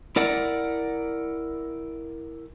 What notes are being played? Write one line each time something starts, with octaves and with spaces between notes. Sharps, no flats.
E4 A#4 D5 F#5